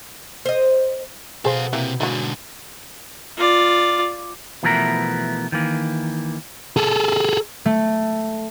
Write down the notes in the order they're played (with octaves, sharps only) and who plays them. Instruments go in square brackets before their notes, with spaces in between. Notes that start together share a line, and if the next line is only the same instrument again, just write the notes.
[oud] C5 D#5
[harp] B2 [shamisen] G#4 C5 [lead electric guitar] A4 F5
[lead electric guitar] C3 [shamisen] E3 A#3
[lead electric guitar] G#2 D3 [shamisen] F#3 A#3 E4
[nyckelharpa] F4 D5
[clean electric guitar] B2 E3 F3 A3 B3 A#4
D#3 E3 A#3
[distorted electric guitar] G#4 A4
[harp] A3